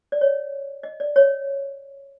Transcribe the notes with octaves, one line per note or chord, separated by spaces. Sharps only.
D5
C#5
D#5
D5
C#5